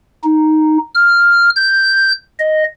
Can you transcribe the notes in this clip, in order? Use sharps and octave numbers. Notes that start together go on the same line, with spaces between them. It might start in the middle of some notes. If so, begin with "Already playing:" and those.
D#4
F6
G6
D#5